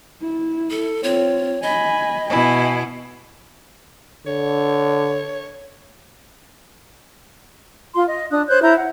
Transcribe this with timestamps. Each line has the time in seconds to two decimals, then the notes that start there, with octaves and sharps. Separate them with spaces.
0.21 E4
0.70 A4
1.03 C4 F4 C#5
1.63 D#5 G#5 B5
2.28 B2 E4 G#5
4.26 D3 C#5
7.94 F4 C6
8.07 D#5
8.31 D4 D#6 F#6
8.48 C5 C#5 F#6 G6
8.62 E4 A#5 G6
8.76 F#5